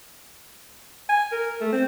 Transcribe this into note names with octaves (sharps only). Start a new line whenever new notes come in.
G#5
A#4
A3
C4